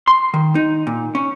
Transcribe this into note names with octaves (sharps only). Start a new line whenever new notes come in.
C6
D#3
D#4
A#2
C#4